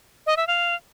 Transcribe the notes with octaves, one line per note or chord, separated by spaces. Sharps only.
D#5
E5
F5